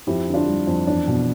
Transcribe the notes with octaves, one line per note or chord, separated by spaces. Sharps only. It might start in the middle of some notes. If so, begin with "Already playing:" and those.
F2 E4 G4
D3
D4 F4
G3
F2
E2 D4
B2